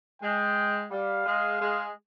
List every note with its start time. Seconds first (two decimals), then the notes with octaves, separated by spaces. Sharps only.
0.22 G#3 G5
0.91 G3 F5
1.26 G#3
1.61 G#3